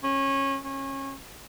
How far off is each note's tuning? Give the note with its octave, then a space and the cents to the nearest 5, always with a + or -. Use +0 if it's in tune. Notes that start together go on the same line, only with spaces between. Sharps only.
C#4 -20
C#4 -25